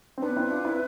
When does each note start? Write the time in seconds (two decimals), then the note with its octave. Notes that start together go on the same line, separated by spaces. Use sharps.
0.18 C4
0.22 B3 D4 B4
0.36 C4 E4
0.51 D4 F4
0.65 C4 E4